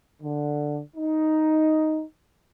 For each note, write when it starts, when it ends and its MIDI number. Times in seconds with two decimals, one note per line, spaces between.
0.22 0.80 50
0.96 2.02 63